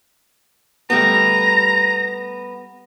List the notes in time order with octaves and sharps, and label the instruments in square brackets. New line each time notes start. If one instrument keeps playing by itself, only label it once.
[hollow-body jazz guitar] G3 A3 B3 [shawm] A#5